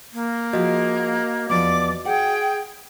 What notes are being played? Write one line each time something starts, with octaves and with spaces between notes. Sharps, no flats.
A#3
F3 G#3 F#4 D#5
E2 F3 B3 D5 D6
G#4 F#5 G5